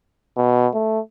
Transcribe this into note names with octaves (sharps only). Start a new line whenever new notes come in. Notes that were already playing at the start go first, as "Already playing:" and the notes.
B2
A3